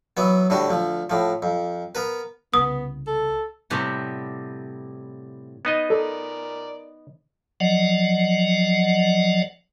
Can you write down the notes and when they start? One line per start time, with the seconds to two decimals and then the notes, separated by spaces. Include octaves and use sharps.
0.17 E3 F#3 B3
0.50 A2 D3 G3 F#4
0.70 D2 F3
1.10 A2 F3
1.42 F2
1.95 B3 A#4 B4
2.54 C2 C#3 B3 D#6
3.07 A4
3.70 A2 C3 G3 B3 G4 F#5
5.65 B3 D#4 D#5
5.90 A4 A#4 D5
7.60 F3 F#3 D5 D#5 F#5